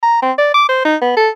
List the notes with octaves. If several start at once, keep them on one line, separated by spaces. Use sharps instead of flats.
A#5
C4
D5
D6
C5
D#4
B3
A4